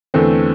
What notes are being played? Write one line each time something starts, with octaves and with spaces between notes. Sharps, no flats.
E2 D3 A3 C4